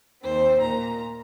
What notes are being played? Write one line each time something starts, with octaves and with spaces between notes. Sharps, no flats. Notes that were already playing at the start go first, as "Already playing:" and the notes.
D#2 D#3 C4 C5
A#2 A#3 A#5